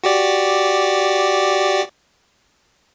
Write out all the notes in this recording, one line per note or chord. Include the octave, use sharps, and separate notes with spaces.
F#4 G4 D5